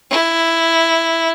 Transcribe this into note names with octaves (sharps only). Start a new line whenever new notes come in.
E4